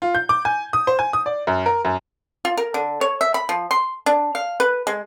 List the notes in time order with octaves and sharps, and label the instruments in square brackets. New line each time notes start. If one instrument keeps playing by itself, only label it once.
[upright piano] F4
G6
D6
G#5
D#6
C5
G#5
D#6
D5
F#2
A#4
F#2
[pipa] F4
A#4
D3
C#5
E5
B5
F3
C6
D4
F5
B4
G#3